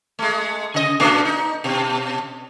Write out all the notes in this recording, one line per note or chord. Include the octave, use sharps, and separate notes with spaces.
G#3 A3
C#3 D#5
A#2 A3 D4
D#4
B2